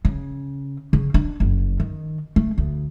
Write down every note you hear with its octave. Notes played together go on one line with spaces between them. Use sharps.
C#3
C#3
D4
F#1
D#3
A3
D2